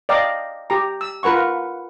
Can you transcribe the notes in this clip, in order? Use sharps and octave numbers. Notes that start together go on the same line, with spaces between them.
D5 D#5 F5 G5 A#5
G4 A#5
E6
F4 A#4 B4 F#5 C#6